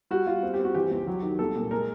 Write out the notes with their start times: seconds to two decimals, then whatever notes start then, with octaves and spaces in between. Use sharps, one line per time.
0.11 G3 F#4
0.26 G3 F4
0.43 C4
0.54 G4
0.59 C4
0.65 F#4
0.74 E3 G4
0.91 C#2
1.07 F#3
1.23 D#3
1.39 C2 A4
1.55 A#2
1.71 G#3 A#4